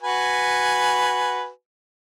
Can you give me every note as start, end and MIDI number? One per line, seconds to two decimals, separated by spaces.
0.02 1.49 66
0.02 1.49 71
0.02 1.49 80